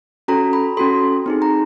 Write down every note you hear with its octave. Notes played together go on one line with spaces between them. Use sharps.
C#4 F#4 A4 A#5
B5
C#4 F#4 A4 C6
C4 D#4 G#4
A#5